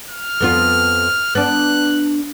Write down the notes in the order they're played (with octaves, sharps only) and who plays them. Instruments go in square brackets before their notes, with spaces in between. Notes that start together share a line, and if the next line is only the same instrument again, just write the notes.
[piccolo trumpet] F6
[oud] F2 B3 F4
[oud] B3 D4 [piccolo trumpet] F#6